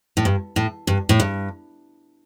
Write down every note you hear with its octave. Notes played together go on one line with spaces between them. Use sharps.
A2
G2
A2
G2
A2
G2